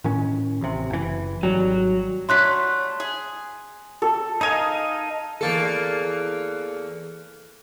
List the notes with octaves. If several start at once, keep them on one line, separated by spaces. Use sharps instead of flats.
A2 D#3 C#4
A1 C3
F#1 E3
G#1 F#3 G3
F#3 G3 A3 C6 F#6 B6
G#4
A4
D#4 A#4 D#5 F5 G#5
E2 A#3 A4